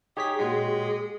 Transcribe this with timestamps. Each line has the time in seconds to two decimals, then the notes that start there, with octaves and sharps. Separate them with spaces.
0.17 D#4 G4 G#4 C#5 D#6 B6
0.39 A#2 G#3 F#4 G#4 C6